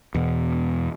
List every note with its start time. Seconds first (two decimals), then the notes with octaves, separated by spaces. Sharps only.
0.15 E2 B2